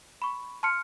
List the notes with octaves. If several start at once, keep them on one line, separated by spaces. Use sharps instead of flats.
B5 C#6
A5 C6 F6 C#7